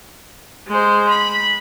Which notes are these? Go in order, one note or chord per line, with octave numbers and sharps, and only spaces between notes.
G#3 C5
B5